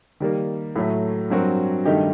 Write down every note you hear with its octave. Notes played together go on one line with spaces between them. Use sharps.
D#3 G3 A#3
A2 F#3 A3
G2 F#3 C4 F#4 A#4
G2 D#3 A3 D#4 G4